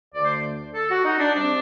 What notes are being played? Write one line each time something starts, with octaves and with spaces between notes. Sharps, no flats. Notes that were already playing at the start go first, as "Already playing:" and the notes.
D2 D3 A3 D4 D5
C5
A4
F#4
D#4
D4
C3 G3 C4 D4